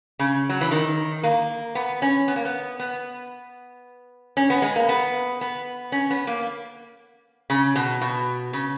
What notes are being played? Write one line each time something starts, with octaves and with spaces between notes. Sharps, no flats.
C#3
F#3
E3
D#3
A#3
B3
C#4
B3
A#3
B3
B3
C#4
B3
G#3
A#3
B3
B3
C#4
B3
A#3
C#3
B2
B2
C#3